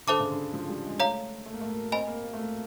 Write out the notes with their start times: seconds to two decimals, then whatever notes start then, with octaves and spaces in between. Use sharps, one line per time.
0.07 D3 A4 C5 E5 A5 D6
0.20 C#3
0.31 D3
0.53 F3
0.69 G3
0.85 G#3
1.00 A3 C#5 F5 A#5
1.46 A3
1.53 A#3
1.61 A3
1.69 A#3
1.92 C4 D#5 G#5 B5
2.08 A#3
2.23 A#3
2.33 A3
2.43 A#3